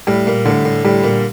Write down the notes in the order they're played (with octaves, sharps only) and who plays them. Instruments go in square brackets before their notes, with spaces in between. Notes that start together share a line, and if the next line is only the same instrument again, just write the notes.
[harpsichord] A2 [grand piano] G3
[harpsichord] A#2
[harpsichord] A2 [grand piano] D3
[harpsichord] A2
[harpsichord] A2 [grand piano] G3
[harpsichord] A#2